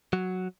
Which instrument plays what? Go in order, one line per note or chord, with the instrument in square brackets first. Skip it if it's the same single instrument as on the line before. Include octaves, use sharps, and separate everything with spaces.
[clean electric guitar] F#3